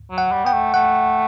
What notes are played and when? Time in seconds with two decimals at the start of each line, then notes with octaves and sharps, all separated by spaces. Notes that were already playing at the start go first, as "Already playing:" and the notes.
0.11 F#3
0.18 F#5
0.32 G3
0.44 B3 G5
0.53 A3
0.74 A3 F#5